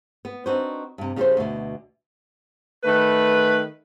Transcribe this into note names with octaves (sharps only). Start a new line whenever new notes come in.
B3
C4 D4 D#4 F#4 B4 C5
G2 C3
C#3 G3 F4 G4 A4 C5
D2 B2
D#3 A3 B4